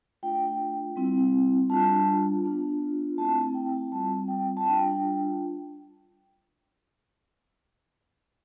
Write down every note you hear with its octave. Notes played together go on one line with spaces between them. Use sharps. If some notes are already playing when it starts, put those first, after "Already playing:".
A3 D4 F4 G5
G3 C4 E4
G3 D4 F4 A5
B3 D4 F4
A3 C4 E4 A5
G5
G3 C4 F4 A5
G5
A5
G3 D4 F4 G5